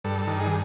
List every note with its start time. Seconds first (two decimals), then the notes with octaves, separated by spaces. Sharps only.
0.04 G2 A4
0.22 A4
0.27 D#3
0.40 G#4